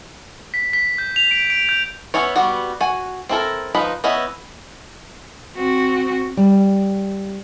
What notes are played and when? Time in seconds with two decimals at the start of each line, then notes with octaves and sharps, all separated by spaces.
0.54 B6
0.73 B6
0.98 G6
1.16 F7
1.31 D7
1.50 D7
1.69 G6
2.14 B3 C#4 E4 C#5
2.36 G3 B3 F#4
2.81 F#4 G#5
3.29 C4 E4 A4 A#4
3.75 F3 D#4 B4 B5
4.04 B3 C#4 E4 D#5 E5
5.55 C4 F#4
6.37 G3